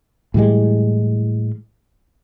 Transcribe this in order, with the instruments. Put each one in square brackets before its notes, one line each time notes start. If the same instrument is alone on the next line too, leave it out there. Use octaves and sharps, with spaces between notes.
[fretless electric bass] A2 E3 G3 G#3